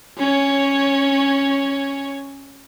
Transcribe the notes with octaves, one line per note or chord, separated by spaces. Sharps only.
C#4 C#5